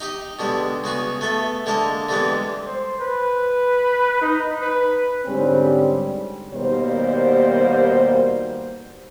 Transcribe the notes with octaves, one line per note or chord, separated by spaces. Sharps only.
D#4 G4 D#5
B2 D3 G3 G#3
C#3 B3 F#4 G#4
A3 B3 A4 E5
D3 G#3 A#3 D#5 A5
D3 E3 G3 G#3 B3 C4
C5
B4
D#4
B4
G#2 D3 G3 C4 C#4 G#4
D#2 B2 G3 A#3 C5